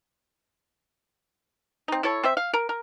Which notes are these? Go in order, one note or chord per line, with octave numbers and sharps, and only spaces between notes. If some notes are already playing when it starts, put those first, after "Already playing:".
C4 D#4
E4 A4 C#5
C4 C5 E5
F5
A#4
A#4